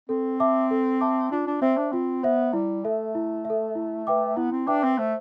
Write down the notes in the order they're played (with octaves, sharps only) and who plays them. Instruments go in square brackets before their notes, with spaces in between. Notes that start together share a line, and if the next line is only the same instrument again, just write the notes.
[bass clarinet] C4 [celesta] A4
[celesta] E5 A5 D6
A4
E5 A5 D6
[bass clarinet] D4 [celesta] F4
[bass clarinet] D4
[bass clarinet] C4 [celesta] C5 E5
[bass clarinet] D4
[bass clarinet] C4 [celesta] F4
[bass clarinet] B3 [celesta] C5 E5
[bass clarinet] G3 [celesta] E4
[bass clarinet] A3 [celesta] A4 E5
[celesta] E4
E5
A4
E4
B4 E5 G5 D6
[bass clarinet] B3 [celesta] E4
[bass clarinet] C4
[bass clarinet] D4 [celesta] B4 E5 G5 D6
[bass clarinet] C4
[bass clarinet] A3 [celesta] C5